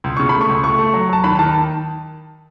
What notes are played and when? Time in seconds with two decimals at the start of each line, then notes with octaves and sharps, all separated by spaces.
0.04 C#2
0.17 C#3 C#6
0.29 A3 B5
0.41 C#6
0.49 C#2
0.64 A3 C#6
0.79 A3
0.94 F#3
1.09 F#3 A5
1.24 D#2 B5
1.39 D#3 A5